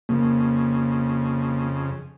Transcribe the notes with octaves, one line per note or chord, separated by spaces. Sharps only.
F2 C#3 A#3